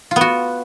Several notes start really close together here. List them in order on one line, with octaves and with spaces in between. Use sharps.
F4 B3 F#4